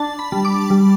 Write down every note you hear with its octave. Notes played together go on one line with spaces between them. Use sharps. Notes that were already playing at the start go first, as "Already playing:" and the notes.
Already playing: D4 A5
B5
G3
D6
G3